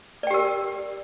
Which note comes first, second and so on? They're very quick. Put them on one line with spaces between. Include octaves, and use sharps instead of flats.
D5 G5 G4 A#4